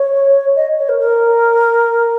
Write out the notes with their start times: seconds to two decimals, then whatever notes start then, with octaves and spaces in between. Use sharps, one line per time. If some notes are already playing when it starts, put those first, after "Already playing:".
Already playing: C#5
0.55 D#5
0.78 C#5
0.88 A#4
0.99 A#4